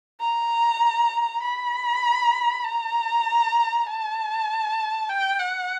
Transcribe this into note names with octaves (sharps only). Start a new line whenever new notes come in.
A#5
B5
A#5
A5
G5
F#5